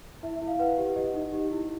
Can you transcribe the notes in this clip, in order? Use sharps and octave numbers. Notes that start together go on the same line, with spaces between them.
E4 E5
E5
E4
F5
B4 F#5
G4
G4 D#5
D#4
G4
E4